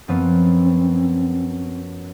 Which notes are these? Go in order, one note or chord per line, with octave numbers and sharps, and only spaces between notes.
F#2 F3 B3 C4